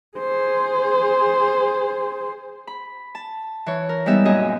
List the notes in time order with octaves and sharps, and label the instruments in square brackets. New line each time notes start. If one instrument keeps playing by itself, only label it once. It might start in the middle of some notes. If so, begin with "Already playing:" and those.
[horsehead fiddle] G#4 C5
[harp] B5
A5
E3 C#5
A#4
G3 G#3 B3 D#4 G4 E5
F#2 A#2 G#4 D#5